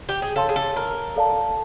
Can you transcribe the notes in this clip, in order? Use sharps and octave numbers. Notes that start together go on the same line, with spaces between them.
G4
G#4
A4 C#5 F5 A5 C6
G#4
A4
A#4
A4 D5 F5 A5